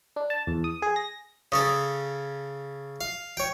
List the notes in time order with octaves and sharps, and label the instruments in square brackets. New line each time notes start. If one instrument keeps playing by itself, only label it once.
[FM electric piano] D4
A5
E2
D#6
G#4
A#6
[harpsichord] C#3 C#4 A4 [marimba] D#6
[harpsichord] F5
C#5 G5